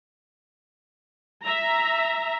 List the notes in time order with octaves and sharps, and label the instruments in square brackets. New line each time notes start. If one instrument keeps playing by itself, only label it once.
[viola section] E5 A#5